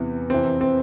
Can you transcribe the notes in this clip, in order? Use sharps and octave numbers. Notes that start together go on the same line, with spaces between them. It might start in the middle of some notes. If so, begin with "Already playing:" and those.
Already playing: E2 C3 E3
F2 C3 E3 C4
C4